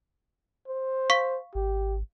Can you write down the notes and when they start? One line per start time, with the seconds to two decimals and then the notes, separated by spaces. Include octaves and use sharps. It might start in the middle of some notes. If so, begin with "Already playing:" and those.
0.68 C5
1.10 F5 C#6 B6
1.55 G#1 G4